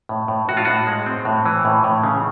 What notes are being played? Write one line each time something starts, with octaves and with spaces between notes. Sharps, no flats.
A2
A2
A2 F#4
F4
A2 F#4
G#3
C4
A2
E3
A2
A2
C#3